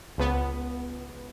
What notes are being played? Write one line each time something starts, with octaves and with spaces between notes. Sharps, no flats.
C#2 B3